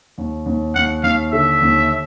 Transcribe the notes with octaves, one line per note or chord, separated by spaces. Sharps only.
D#2
D#2
D#2 F#5
D#2 F5
D3 E5
D#2